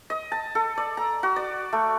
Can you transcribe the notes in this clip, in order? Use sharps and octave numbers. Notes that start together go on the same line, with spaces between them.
D#5
A5
A4
D5
A#5
F#4
D5
A3